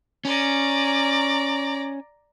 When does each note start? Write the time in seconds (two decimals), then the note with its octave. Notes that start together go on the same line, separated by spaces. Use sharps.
0.25 C#4 D5 A#5